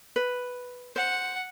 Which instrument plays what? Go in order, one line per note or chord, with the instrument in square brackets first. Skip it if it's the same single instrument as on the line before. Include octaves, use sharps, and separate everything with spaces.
[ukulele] B4
[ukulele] C5 [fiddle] F#5